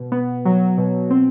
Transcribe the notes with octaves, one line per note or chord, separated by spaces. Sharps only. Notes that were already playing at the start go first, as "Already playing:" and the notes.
Already playing: B2
B3
F#3
B2
C4